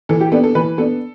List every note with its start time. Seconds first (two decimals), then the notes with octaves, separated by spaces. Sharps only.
0.09 E3 A4
0.21 G4
0.32 B3 D4 A4
0.44 A4
0.55 E3 B4
0.78 B3 D4 A4